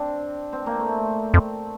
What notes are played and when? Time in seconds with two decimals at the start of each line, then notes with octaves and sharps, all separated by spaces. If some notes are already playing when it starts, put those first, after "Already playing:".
Already playing: C4 D4
0.53 C4
0.66 A#3
0.80 A3
1.34 F2